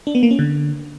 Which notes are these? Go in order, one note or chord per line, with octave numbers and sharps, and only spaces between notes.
D4
B3
A#3
C#4
D3